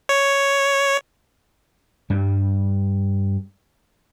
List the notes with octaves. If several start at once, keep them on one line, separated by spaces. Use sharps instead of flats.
C#5
G2 G3